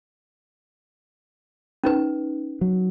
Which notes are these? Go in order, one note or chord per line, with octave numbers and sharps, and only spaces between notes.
C#4 D#4 B4
F#3